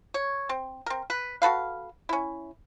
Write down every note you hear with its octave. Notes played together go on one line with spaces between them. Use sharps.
C#5
C4
C4 A#4
B4
F#4 A4 B4 F5
C#4 E4